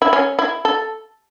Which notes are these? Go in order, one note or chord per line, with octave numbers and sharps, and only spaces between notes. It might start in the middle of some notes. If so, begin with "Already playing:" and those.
E4
C#4
E4
A4